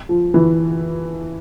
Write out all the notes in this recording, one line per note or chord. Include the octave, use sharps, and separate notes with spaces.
F3
E3